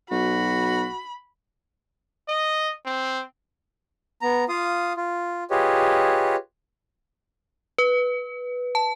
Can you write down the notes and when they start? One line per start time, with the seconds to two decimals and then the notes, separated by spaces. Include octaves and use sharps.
0.11 B1 F#4 B5
2.28 D#5
2.86 C4
4.21 B3 A#5
4.49 F4 F5 D#6
4.97 F4
5.51 F4 G4 G#4 B4 C#5 D#5
7.78 B4
8.75 A5